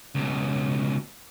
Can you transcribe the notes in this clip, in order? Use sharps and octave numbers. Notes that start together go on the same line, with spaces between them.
C#2 B2